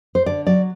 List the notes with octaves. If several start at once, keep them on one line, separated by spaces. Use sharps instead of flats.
C5
D3 D5
F#3 D5